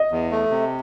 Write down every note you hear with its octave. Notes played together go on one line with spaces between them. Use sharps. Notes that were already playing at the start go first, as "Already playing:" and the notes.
Already playing: D#5
E2
A3
C3